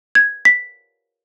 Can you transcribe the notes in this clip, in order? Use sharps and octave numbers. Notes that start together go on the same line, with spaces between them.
G#6
B6